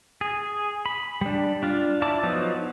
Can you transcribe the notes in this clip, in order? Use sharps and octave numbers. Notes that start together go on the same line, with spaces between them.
G#4
B5
G3 D4
D4 F4
E4 D5 A5 D6
F3 F#3 B3 D#4